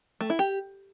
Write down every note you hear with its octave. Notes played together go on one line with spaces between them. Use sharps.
A3
E4
G4